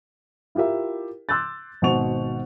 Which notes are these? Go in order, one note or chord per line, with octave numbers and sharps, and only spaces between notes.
E4 F4 G4 A#4 E5
C6 D6 E6 F#6 G6 A6
G#1 B2 C5 F#5 C#6 F7